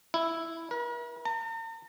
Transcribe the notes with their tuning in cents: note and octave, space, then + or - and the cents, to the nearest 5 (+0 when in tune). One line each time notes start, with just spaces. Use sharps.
E4 +0
A#4 +45
A#5 -45